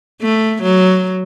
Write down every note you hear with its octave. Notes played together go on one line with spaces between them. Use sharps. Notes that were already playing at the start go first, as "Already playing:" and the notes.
A3
F#3